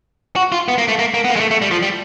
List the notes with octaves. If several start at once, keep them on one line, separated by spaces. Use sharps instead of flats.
F#4
F4
B3
A#3
A3
A#3
A#3
B3
A#3
G#3
A3
A3
G3
F3
G3